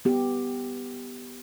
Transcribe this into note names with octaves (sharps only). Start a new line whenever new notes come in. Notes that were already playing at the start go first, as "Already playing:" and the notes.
B3 G4